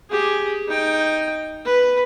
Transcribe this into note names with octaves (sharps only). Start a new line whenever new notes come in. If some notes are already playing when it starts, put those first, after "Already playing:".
G4 G#4
D#4 G5
B4